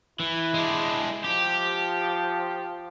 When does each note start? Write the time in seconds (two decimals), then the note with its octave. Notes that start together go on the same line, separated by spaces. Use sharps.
0.20 E3 E4
0.54 G#3 D4
1.24 F3 G4